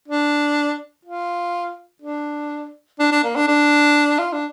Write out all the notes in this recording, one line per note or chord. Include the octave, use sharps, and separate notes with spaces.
D4
F4
D4
D4
D4
A#3
D4
D4
F4
D4